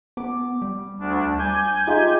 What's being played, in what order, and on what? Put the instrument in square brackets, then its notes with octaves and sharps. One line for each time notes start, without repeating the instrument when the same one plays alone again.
[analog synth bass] B3 [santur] D6
[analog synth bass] G3
[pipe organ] D2 D4
[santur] D5 [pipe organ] G#5 G6
[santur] G#3 F4 G4 [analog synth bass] D#4